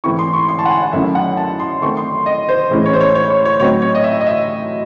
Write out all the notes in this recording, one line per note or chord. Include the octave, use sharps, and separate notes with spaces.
G#2 E3 A3 C4 E4 C#6
C6
C#6
C6
A5
F#5
G#5
F#5
F#2 D#3 A3 C#4 E4 E5
F#5
A5
C6
D#3 A3 C4 C#6
C6
D#5
C5
A2 E3 G#3 C#4 E4
C#5
C5
C#5
C#5
C#5
C#5
A2 F#3 C4 D#4 C#5
C#5
D#5
E5
D#5
E5